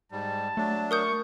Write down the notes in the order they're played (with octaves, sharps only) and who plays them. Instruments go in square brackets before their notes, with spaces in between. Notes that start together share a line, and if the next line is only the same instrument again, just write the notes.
[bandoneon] G#2 G3 [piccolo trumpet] A5
[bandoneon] F#3 D4 [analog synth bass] A3
[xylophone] A#4 D#6 G6 [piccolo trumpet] C#6